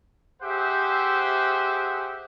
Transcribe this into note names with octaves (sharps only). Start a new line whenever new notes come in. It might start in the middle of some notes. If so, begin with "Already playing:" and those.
G4 G#4 C5 E5 F#5